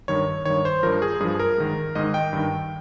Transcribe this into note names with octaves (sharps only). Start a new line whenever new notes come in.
G2 D#3 C#5
G2 D#3 C#5
C5
G2 F3 A#4
G#4
G2 F3 G#4
A#4
G#2 D#3
G#2 D#3 D#5
G5
G2 D#3